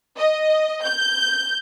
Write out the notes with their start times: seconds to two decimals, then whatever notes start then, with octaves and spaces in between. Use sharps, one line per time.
0.19 D#5
0.83 G6